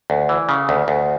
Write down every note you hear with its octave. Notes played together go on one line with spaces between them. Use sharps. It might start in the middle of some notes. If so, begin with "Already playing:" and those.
D2
E3
C#3
D2
D2